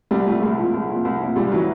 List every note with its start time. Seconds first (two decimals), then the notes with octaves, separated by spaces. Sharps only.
0.11 C2 G3
0.26 A#2 F3 A3
0.42 C2 G#3
0.58 A#2 F3
0.74 C2
0.89 A#2 F3
1.05 C2
1.20 A#2 F3
1.36 C#2 G3
1.51 C#3 E3 F#3